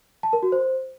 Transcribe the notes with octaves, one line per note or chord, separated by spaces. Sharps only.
A5
A#4
F#4
C5